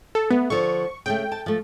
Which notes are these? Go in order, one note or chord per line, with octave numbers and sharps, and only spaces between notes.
A4
A3 B3
D3 F3 C#6
C#3 A3 G5
A5
F3 A3